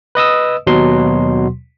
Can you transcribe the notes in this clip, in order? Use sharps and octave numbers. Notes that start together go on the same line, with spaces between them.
B4 D#5 D#6 E6
D#2 B2 F#3 C6